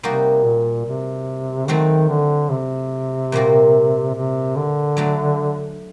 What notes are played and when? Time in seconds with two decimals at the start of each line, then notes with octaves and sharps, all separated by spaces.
0.03 C3 G3 A#3 D#4 F#4
0.45 A#2
0.86 C3
1.68 D#3 F#3 A3 C4 F#4
2.09 D3
2.50 C3
3.32 A#2 G3 A#3 F#4
4.14 C3
4.56 D3
4.97 F#3 A3 D4